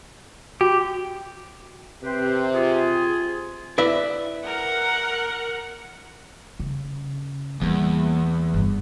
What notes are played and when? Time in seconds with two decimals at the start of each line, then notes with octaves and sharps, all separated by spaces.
0.61 F#4 G4
2.04 C3 B4 C5 G5
2.54 F4 G#4
3.78 E4 B4 D5 E5
4.46 A#4 F#5
6.59 C#3
7.61 E2 G3 A#3
8.54 G1